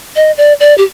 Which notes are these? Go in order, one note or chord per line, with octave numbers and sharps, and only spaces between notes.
D#5
D5
D5
G4